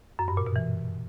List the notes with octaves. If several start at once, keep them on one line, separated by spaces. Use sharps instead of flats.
F#2
G2
A#2
B2
E3